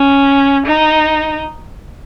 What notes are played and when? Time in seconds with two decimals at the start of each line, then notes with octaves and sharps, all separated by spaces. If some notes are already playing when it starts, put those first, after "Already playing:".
Already playing: C#4
0.66 D#4